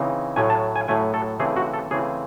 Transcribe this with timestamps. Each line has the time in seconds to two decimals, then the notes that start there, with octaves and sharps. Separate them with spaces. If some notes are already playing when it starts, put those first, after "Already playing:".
Already playing: C#3 E3 C4 D#4
0.36 A2 F#3 A3 G#5
0.50 A5
0.76 G#5
0.88 A2 F#3 A3 G#5
1.14 A4
1.39 C#3 E3 A3 C4 G#4
1.56 F#4
1.73 A4
1.91 C#3 E3 A3 C4 G#4